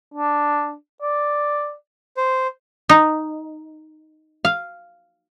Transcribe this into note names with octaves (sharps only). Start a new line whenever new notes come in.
D4
D5
C5
D#4
F5